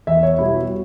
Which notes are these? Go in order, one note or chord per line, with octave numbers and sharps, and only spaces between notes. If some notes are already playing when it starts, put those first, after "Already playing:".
E2 E5
C#5
B2 G3 B3 E4
F#4